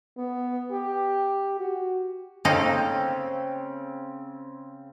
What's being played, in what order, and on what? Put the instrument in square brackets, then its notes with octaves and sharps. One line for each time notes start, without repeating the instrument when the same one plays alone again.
[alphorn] B3
G4
F#4
[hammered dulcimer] C#3 C4 [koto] A#3 D#4 A4